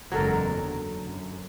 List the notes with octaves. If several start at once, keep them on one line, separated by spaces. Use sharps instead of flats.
F#1 E2 F#3 G#3 A4 A#4
D3
F#2